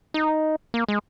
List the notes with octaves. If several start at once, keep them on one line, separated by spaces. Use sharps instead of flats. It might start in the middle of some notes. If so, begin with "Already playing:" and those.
D#4
A#3
G#3